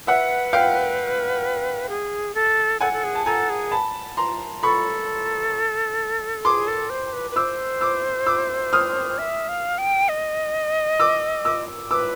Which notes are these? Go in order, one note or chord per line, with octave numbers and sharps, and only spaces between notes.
B4 E5 F#5
F5 G5
G#4
A4
A4 F#5 G#5
A4
G#4
A5
A4 G#5 A#5
G#4
A5 B5
A#5 C6
A4 B5 C#6
G#4 C6 D6
A4
C5
B4
B4
C5 D6 E6
D6 E6
D6 E6
D#6 F6
E5
F5
G5
D#5
D6 E6
D6 E6
B4 D6 E6